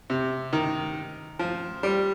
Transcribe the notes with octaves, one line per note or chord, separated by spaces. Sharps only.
C3
D#3
F3
G3